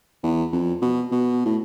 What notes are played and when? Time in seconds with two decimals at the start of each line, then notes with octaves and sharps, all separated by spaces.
0.23 E2
0.52 F2
0.82 B2
1.11 B2
1.45 A2